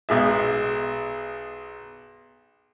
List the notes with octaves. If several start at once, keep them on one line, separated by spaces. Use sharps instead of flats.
B1 G#3 E5